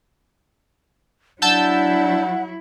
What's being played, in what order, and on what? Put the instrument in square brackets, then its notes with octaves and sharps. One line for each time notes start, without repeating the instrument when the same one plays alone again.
[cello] F#3 E4 [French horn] D4 [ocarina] F#5 [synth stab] A5 E6 G6